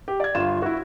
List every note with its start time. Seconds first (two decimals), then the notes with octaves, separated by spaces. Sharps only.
0.08 G4
0.20 D5 G#6
0.35 G1 F4 E7
0.62 E4 F#4